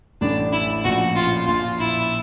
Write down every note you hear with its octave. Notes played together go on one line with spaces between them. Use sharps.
A1 A2 D4
E4
A#1 A#2 F#4
F4
A#1 A#2 F4
E4